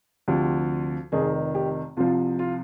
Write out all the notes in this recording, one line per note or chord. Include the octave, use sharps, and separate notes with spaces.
D2 C3 F3 G4
F1 F2 D#3 G#4
G4
C2 C3 F3 F4
F4